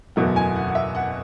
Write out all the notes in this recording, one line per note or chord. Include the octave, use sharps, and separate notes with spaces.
F#1 E2 B2 F#3 A3 F#5
G#5
F#5
F#5
E5
F#5